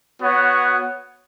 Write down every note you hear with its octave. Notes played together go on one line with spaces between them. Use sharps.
B3 F#4 C#5 F#5